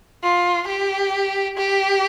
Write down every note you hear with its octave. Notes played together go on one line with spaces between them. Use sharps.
F4
G4
G4